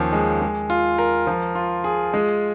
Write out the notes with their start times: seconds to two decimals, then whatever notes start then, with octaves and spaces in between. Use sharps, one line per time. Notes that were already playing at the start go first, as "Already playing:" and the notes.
Already playing: D#2 F3 C#4
0.13 G#3
0.42 G#3
0.70 F4
0.98 A#4
1.27 F3
1.55 F4
1.84 G#4
2.14 G#3